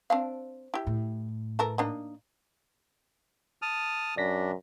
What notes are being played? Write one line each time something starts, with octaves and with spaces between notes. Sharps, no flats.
C4 D4 F5
E4 G4
A2
E3 A4 A#4
A#3 D4 D#4
A5 D#6 F6
F#2 D4 D5 A#6 B6